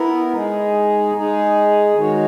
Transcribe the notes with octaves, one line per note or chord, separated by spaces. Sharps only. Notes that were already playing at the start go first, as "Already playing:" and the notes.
Already playing: B3 E4 A#4
G#3 D#4 G#4
G#3 D#4 G#4
D#3 G#3 D#4 F#4 C#5